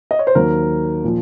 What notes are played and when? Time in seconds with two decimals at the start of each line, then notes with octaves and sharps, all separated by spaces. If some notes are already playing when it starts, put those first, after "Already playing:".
0.11 D#5
0.19 C#5
0.27 C5
0.35 D#2 D#3 F#3 A#4
1.04 A#2 F3